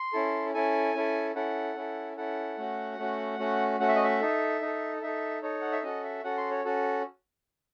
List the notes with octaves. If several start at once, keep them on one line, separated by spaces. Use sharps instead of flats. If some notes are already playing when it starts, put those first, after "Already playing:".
Already playing: C6
C#4 E4 A4
C#4 E4 A4 G#5
C#4 E4 A4
C#4 E4 A4 F#5
C#4 E4 A4
C#4 E4 A4 F#5
A3 C#4 F#4
A3 C#4 F#4
A3 C#4 F#4
A3 C#4 F#4 F#5
E5
D#5
E5
D#4 A4
D#4 A4
D#4 A4 E5
D#4 A4 C#5
F#5
E5
C#4 F#4 A4 D#5
E5
C#4 F#4 A4 F#5
C6
C#5
C#4 F#4 A4